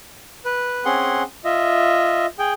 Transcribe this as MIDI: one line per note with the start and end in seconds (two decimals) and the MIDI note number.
0.45 0.85 71
0.85 1.23 60
0.85 1.23 61
0.85 1.23 68
0.85 1.23 78
0.85 1.23 84
1.44 2.26 65
1.44 2.26 75
1.44 2.26 76
2.39 2.53 68
2.39 2.53 79